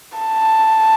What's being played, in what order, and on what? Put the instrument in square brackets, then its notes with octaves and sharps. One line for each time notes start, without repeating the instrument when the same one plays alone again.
[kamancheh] A5